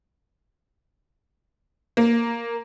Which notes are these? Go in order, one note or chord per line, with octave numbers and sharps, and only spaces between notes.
A#3